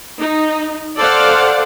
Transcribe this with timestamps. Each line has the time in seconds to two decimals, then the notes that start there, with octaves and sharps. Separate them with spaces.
0.19 D#4
0.97 A4 C5 D5 F5 F#5